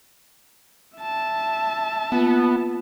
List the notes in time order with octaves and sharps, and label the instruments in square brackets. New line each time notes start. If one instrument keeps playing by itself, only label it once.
[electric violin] E5 A5
[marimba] A#3 F4 B4 [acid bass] B3